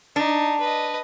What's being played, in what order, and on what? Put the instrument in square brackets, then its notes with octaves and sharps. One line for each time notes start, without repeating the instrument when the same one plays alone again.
[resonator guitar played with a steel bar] D4 [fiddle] D#4
[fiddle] B4 D#5